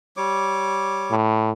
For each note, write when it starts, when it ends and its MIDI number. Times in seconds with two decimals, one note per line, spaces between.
0.17 1.15 55
0.17 1.15 73
0.17 1.15 86
1.11 1.51 45